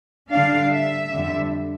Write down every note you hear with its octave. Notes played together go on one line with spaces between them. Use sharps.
D3 G3 D4 F5
E5
F2 D3 G3